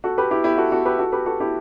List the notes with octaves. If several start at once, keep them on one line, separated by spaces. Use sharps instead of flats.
F#4 A4
G4 B4
E4 G4
E4 G4
F#4 A4
F#4 A4
G4 B4
F#4 A4
G4 B4
F#4 A4
E4 G4